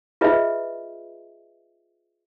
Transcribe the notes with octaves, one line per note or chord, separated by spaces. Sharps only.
F4 G#4 B4 D#5 E5